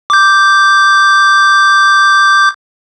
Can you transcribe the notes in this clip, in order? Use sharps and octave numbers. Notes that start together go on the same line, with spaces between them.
D6 G6